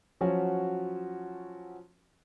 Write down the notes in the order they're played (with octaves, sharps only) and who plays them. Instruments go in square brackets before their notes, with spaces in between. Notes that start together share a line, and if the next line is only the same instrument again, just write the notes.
[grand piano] F3 F#3 C#4 F#4